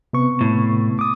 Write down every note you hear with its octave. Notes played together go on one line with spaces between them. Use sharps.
C3 B3 C#6
A2
D6 D#6